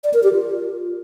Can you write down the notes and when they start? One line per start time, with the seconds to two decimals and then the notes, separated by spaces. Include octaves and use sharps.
0.04 D5
0.14 A#4
0.23 G4
0.33 F4